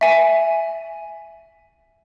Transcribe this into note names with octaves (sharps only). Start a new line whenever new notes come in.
E5 G#5